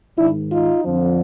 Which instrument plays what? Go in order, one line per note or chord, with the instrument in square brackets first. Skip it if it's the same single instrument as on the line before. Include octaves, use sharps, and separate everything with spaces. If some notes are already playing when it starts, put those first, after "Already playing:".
[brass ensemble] G#2 D#3 D4 E4
D#4 F4
F2 D3 F3